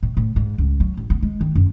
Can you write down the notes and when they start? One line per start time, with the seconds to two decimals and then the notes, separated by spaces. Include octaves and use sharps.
0.03 A2
0.17 A2
0.36 G#2
0.58 C#2
0.80 F#3
0.97 A1
1.10 B3
1.23 G#3
1.41 D#3
1.55 F#2